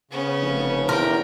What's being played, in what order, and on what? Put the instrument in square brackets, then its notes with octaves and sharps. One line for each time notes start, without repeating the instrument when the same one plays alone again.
[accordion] C#3 [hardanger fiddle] B3 C#4
[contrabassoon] F1
[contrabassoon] E2 [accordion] C3 [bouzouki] A#4 [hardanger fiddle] G5